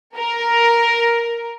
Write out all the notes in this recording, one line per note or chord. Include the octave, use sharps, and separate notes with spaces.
A#4